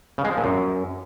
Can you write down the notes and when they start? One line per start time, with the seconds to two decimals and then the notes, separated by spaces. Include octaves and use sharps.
0.18 C#3
0.25 G#3
0.31 F3
0.37 A#2
0.44 F#2